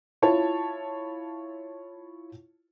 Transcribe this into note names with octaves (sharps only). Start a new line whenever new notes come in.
E4 F4 C#5 A5